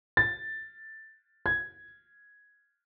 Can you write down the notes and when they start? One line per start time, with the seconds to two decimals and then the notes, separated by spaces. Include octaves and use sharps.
0.17 A6
1.46 G#6